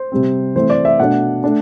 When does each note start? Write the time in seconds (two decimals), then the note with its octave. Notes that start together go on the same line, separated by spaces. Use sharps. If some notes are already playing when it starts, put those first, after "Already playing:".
Already playing: C5
0.12 C3 G3 C4
0.55 E3 A3 C4 C5
0.70 D5
0.85 E5
1.00 B2 A3 D4 F#5
1.44 A3 D4